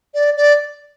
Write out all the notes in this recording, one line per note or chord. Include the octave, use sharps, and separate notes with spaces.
D5
D5